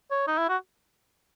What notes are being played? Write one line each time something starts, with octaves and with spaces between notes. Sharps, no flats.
C#5
D#4
E4
F#4